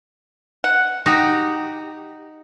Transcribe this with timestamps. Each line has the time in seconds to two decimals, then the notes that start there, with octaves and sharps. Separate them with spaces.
0.64 F#5
1.06 D#4 F#4 G4